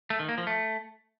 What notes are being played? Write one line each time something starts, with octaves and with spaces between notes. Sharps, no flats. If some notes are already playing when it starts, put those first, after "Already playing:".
A3
D#3
A#3
F3
A3